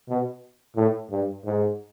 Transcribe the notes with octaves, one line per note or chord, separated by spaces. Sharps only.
B2
A2
G2
G#2